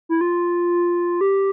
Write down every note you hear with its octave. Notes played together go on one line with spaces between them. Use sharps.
E4
F4
G4